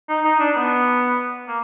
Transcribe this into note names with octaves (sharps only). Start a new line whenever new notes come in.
D#4
D#4
D4
B3
A#3